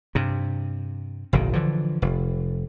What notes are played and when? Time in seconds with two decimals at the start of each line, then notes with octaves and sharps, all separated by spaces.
0.15 G2 C3
1.33 F#1 B1 A2 D#3
1.53 D3 E3 F3
2.02 F1